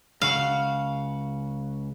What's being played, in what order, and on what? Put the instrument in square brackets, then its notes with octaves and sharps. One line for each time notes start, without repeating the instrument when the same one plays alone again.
[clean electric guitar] C#2 C#3 F#4 [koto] F5